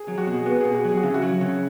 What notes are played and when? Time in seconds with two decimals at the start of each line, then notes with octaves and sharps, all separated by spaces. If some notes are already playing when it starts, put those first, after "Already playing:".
Already playing: G#4
0.08 F#3
0.18 F#4
0.27 B2
0.34 G#4
0.46 B3 F#4
0.60 G#4
0.65 B2
0.75 F#4
0.84 F#3 G#4
0.97 F#4
1.03 C#3 E4
1.14 F#4
1.22 F#3
1.41 C#3